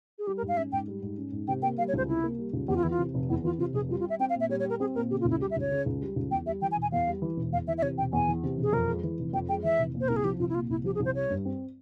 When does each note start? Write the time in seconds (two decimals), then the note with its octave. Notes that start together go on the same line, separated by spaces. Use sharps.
0.19 G#4
0.27 G3 G4
0.37 A#4
0.42 G#2
0.48 F5
0.57 C#4 E5
0.72 G#2 G5
0.88 G3
1.02 G#2
1.17 C#4
1.32 G#2
1.48 C3 G5
1.62 A#3 G5
1.78 G3 F5
1.88 C#5
1.94 C#2 C5
2.08 C3 E4
2.23 A#3
2.39 G3
2.53 C#2
2.68 E2 G4
2.76 F4
2.83 E3 E4
2.90 F4
2.99 C3
3.14 F1
3.29 E2 E4
3.44 E3 F4
3.59 C3 F4
3.74 F1 G#4
3.89 G3 F4
4.00 F4
4.05 G4 E5
4.20 C4 G5
4.29 F5
4.35 A#2
4.40 E5
4.49 G3 C#5
4.60 C#5
4.65 G4 A#4
4.80 C4 G#4
4.95 A#2 A#4
5.10 C#3 G4
5.20 F4
5.25 C#2
5.30 E4
5.41 G3 G4
5.51 E5
5.56 C#2 C#5
5.71 C#3
5.86 C#2
6.01 G3
6.16 C#2
6.31 E2 G5
6.46 G3 E5
6.61 E3 G5
6.72 G#5
6.77 E1
6.82 G#5
6.92 E2 F5
7.07 G3
7.22 E3
7.37 E1
7.52 E2 F5
7.67 E3 E5
7.78 E5
7.82 C3 C#5
7.98 E1 G5
8.13 E2 G#5
8.28 E3
8.43 C3
8.58 E1 G#4
8.73 F2 A#4
8.88 G#3
9.04 E3
9.19 F1
9.33 F2 G5
9.49 G#3 G5
9.64 E3 E5
9.79 F1
9.94 A#2
10.00 C5
10.08 C2 A#4
10.16 G#4
10.24 F3 G4
10.39 C2 F4
10.49 E4
10.55 A#2 F4
10.70 C2 E4
10.84 F3 G4
10.95 G#4
11.00 C2
11.05 C5
11.15 G3 C#5
11.30 G2
11.45 C4